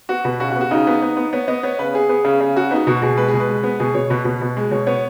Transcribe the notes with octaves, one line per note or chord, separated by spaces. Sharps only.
B3 F#4
B2 B4
C#3 F#4
F#4
B3
F#4
C#3 D#4
B3
B3
B3
B3 C#5
B3 D#5
B3 C#5
C#3 B4
B3 G#4
B3
C#3
C#3
C#3 F#4
B3 D#4
B2 F#4
B2 G#4
G#3 B4
G#4
B2
B4
G#3
B3
B2 G#4
B2 C#5
B2 B4
B2
B2
G#3
B2 C#5
B3 C#5